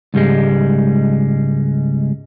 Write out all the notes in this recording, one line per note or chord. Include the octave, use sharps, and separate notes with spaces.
C#2 G#2 G3 G#3